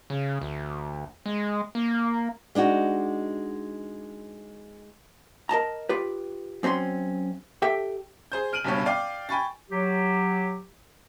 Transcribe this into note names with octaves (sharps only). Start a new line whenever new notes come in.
C#3
D2
G#3
A#3
G#3 D4 D#4 F#4
A#4 D#5 A5 A#5
F4 G4 B4
F#2 C4 C#4 A#5 C6
G4 A4 E5 G5
G#4 C5 G6
F6 D7 D#7 F#7
F#1 G2 B2 G3 C#5
D5 F5 G5 D6
G5 G#5 B5 C#6 A6
F#3 G4